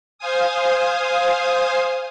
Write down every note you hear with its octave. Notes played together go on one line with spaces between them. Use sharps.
C5 F5 G#5 D#6